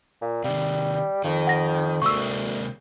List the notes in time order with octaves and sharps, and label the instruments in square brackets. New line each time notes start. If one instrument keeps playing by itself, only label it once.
[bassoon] A#2
[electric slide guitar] C3 D#3 [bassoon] G3
[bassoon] F2 [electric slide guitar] D#3
[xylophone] F#5 A#6
[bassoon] D2 [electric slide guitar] C3 G#3 A#3 [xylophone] C#6 E6